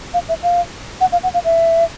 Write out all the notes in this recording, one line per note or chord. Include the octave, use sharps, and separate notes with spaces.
F5
E5
F5
F#5
F5
F#5
F5
E5